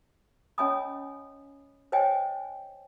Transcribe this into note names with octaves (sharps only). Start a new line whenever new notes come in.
C#4 C#5 D#5 G#5 B5 D#6
C5 C#5 D#5 G5 G#5